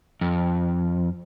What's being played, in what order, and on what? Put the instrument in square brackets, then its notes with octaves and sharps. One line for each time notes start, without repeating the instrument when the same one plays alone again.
[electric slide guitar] F2